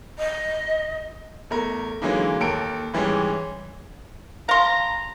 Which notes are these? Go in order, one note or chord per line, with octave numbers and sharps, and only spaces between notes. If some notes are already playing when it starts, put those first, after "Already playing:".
D#5
E2 A3 A#4
D3 E3 F#3 G#3 A#3 D#4
D#2 A4 A#4 D7
G#2 E3 G3 G#3 C#4
F5 A#5 C6